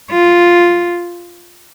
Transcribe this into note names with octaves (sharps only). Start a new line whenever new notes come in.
F4